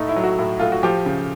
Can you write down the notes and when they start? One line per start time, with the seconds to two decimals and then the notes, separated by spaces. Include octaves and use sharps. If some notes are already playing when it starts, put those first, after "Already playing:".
Already playing: A2 A3 D#4
0.09 E4
0.16 F#3
0.24 F#4
0.39 A2
0.59 A2 F4
0.72 F#4
0.83 F3 G4
1.06 C#3